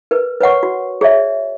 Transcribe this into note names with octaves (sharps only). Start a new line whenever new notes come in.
A#4 B4
B4 C#5 F#5 C#6
F#4
G#4 C#5 D5 E5